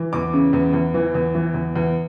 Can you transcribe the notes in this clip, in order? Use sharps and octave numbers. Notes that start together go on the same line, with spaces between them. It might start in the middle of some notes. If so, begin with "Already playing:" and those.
Already playing: E3
E2 D6
C#3
E2
E2
E3
E2
E3
E2
E2